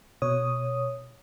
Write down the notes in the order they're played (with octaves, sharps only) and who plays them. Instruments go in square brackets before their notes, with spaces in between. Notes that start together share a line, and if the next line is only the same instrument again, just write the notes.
[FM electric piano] B2 C#5 D#6